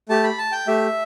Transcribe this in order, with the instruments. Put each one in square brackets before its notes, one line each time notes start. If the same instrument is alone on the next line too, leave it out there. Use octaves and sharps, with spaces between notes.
[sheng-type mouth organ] A3 G4 A5
B5
A5
G5
A3 G4 E5